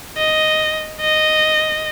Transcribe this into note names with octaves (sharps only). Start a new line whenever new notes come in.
D#5
D#5